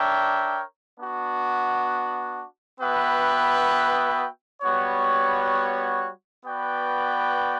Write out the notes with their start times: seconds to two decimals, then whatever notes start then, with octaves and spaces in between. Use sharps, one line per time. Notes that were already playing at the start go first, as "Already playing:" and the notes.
Already playing: D4 A#4 C#5 E5 G5
0.98 B3 D4 F#4
2.81 B3 F#4 B4 E5 G5
4.62 G3 B3 F#4 C#5
6.45 B3 F#4 B4 D5 G5